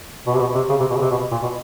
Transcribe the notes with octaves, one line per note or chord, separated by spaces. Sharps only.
B2
C3
B2
C3
C#3
C3
B2
C#3
C3
B2
A#2
B2